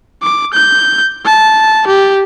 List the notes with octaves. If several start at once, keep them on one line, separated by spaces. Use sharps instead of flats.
D6
G6
A5
G4